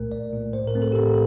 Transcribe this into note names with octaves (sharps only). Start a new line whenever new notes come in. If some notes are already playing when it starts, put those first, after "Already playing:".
Already playing: C2 A#2 A3 A#4
C2 D5
A#2 A3
A2 C5
A#4
A3 C4
A4
G4
A2 A4